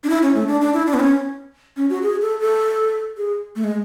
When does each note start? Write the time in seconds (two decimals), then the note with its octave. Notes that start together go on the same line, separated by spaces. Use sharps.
0.04 D4
0.10 E4
0.22 C#4
0.35 A3
0.48 D4
0.61 D4
0.74 E4
0.87 D4
0.94 B3
1.00 C#4
1.77 C#4
1.90 F#4
2.03 G#4
2.22 A4
2.41 A4
3.17 G#4
3.56 A3
3.64 G#3